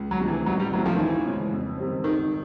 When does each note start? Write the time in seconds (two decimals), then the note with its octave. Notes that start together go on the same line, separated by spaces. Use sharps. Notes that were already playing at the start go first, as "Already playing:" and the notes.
Already playing: C#2
0.11 F#3
0.20 C3 F3 A3 D4
0.28 E3
0.46 A1 F#3
0.60 G3
0.73 G2 E3 F#3 A3 C4
0.86 F3
0.95 D#3
0.99 D2 E3
1.25 C#3 F3 G#3
1.52 F2
1.78 C3 D#3 G3 C4
2.04 G#1 D#3